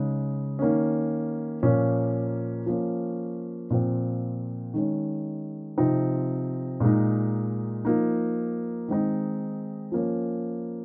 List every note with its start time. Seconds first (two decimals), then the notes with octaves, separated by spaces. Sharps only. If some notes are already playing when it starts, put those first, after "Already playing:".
Already playing: C#3 G#3 D#4
0.59 D#3 A#3 C#4
1.63 A#2 F3 A#3 C#4
2.66 F3 A#3 C#4
3.70 A#2 F3 C4
4.74 D#3 G#3 C#4
5.78 C3 F3 C4 D#4
6.80 A#2 G#3 D#4
7.85 F3 A#3 D#4
8.88 D#3 G#3 C4 D#4
9.92 F3 A#3 C#4